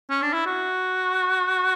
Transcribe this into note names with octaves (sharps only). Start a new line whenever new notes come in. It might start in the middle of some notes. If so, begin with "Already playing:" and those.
C#4
D4
E4
F#4